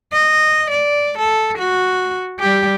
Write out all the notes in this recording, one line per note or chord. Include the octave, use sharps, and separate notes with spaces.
D#5
D5
A4
F#4
G3 G4